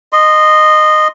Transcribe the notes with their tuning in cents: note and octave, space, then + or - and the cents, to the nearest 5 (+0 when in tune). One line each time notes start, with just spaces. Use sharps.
D#5 -15 C6 +0